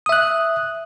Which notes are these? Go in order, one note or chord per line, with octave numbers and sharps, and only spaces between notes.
E5 D#6 F#6